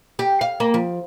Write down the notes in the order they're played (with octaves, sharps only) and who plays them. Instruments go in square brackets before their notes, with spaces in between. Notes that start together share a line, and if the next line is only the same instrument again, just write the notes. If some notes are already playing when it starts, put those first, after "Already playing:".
[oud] G4
F5
A#3
F3